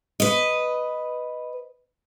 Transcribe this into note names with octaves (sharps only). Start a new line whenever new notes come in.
B4 D#5